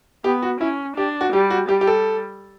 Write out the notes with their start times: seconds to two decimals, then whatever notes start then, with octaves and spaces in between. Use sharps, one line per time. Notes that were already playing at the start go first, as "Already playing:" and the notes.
0.24 B3 G4
0.42 F#4
0.60 C#4 E4
0.96 D4 G4
1.21 F#4
1.33 G3 G4
1.50 F#4
1.69 G3 G4
1.81 G4
1.87 A4